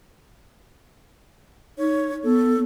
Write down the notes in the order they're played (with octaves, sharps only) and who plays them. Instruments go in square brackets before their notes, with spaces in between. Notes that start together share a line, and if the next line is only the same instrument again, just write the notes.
[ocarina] D#4 [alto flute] C#5
[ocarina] B3 [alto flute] A4